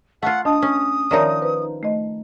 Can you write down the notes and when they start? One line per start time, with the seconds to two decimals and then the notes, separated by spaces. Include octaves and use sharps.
0.22 A3 F4 F#5
0.45 D4 D#5 A5 D#6
0.62 C#4
1.11 D#3 F3 D#4 C#5 D5 E5
1.42 B4 C5
1.83 A3 D#5